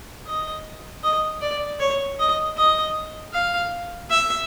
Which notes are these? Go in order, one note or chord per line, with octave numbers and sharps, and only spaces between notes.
D#5
D#5
D5
C#5
D#5
D#5
F5
E5